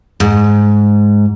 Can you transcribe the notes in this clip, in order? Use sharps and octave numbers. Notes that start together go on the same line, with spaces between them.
G#2